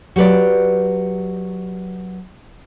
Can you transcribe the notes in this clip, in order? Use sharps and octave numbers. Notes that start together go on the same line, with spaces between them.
F#3 G4 B4 D5